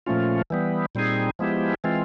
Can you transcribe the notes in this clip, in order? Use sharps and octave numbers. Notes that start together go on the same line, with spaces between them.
A#2 F3 A3 C#4 F4
E3 G3 B3
A#2 G3 C4 D#4 G#4
F3 G#3 B3 E4 G4
E3 G#3 C4 F4